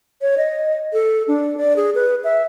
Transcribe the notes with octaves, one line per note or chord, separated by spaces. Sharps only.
C#5
D#5
A4
D4
D5
G#4
B4
E5